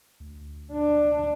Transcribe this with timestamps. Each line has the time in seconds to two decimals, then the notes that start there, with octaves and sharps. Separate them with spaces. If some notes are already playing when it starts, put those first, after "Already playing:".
0.20 D2
0.73 D4